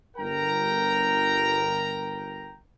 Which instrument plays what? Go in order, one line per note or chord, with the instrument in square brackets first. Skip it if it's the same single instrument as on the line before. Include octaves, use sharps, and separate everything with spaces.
[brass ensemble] G1 A#4 G5 A#5